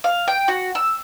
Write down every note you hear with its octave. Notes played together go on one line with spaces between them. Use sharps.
F5
G5
F#4
E6